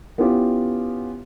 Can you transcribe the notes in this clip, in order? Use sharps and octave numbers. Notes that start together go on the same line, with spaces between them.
B3 C#4 E4 F4 G4